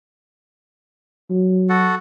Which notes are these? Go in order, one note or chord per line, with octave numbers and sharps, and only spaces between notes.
F#3
F#4 A4 F#5